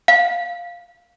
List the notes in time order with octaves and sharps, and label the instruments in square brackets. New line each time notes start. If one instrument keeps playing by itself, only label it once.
[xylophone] F5